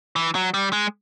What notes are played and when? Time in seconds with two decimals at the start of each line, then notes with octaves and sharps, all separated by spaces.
0.16 E3
0.35 F#3
0.54 G3
0.73 G#3